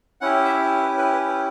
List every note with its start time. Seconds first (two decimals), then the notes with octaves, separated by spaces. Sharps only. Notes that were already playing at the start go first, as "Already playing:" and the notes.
0.21 C#4 E4 G4 F#5
0.45 E5
0.83 B4
0.98 B4
1.12 B4
1.28 B4